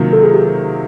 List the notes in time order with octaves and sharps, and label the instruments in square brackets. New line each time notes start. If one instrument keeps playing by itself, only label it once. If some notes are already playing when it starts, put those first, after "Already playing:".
Already playing: [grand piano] C3 D#3 F#3 A#3 [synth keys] F4
[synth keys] A4
G#4
G4